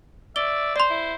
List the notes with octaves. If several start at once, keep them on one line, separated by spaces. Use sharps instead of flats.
D5 E5 G7
C5 D5 C6
E4